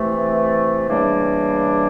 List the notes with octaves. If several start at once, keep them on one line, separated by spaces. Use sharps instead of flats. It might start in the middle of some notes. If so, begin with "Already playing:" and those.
Already playing: C3 E3 A3
C#3 E3 G3 A#3 D4